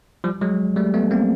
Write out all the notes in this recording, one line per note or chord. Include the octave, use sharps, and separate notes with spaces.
F3 G3
F#3 G#3
G3 A3
A3 B3
A#3 C4